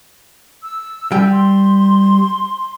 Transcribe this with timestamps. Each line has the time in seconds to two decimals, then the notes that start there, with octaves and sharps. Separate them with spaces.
0.63 E6
1.12 G3 G5
1.32 C6